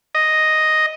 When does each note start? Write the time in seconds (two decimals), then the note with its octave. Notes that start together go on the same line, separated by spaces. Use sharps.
0.15 D#5